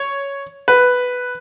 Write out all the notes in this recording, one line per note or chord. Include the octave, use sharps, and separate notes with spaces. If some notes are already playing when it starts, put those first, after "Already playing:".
Already playing: C#5
B4